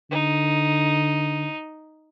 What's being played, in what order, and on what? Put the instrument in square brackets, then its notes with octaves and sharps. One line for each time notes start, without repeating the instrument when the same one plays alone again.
[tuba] D3 [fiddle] D#4